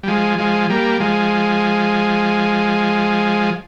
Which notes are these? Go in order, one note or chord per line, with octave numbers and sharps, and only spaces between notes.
G3
F3 G#3
F3 G#3
G3 A#3
F3 G#3